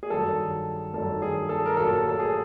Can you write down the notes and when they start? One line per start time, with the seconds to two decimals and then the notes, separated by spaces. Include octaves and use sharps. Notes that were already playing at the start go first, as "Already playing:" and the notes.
0.03 G#4
0.10 G2 D#3 F#3 A4
0.94 G2 D#3 F#3 A4
1.22 G#4
1.49 A4
1.66 A#4
1.77 A#2 F#3 A4
2.09 A4
2.19 G#4